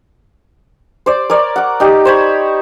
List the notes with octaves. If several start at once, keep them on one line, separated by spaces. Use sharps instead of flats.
C5 D5
A#4 C#5 D5
F#5 D6
D#4 G4 D5
C5 C#5 B5